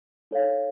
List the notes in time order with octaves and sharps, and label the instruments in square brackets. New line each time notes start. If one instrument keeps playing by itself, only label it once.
[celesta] D#4 A4 C#5 F5